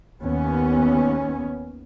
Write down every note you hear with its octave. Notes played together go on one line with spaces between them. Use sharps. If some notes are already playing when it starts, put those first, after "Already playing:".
D#2 B3 C#4